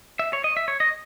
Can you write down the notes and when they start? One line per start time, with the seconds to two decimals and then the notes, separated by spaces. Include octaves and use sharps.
0.19 E5
0.33 C#5
0.44 D#5
0.57 E5
0.68 C#5
0.80 D#5